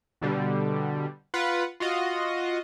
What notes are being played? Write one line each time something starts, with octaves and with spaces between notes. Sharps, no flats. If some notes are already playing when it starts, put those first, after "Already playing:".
B2 D3 G3
F4 B4 F#5
F4 F#4 D#5